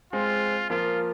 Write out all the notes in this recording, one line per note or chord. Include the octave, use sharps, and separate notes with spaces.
G#3 C4 F4
F3 A#3 F4